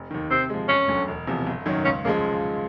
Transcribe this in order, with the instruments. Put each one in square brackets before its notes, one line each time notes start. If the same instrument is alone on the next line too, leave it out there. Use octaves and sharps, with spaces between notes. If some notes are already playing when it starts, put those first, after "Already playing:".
Already playing: [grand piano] F1
D#2 D#3
[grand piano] C3 [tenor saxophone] C4
[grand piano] F3 G#3
[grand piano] E1 [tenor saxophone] C#4
[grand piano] D2 D3 F#3
E1
E2 C3 F3
G1
F#2 D#3 F#3
[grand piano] C#2 [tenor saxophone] C#4
[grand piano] C#3 F3 G#3 [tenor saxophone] A#3